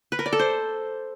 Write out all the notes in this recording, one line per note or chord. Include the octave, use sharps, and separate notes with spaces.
B4
A#4
D5
A4
C5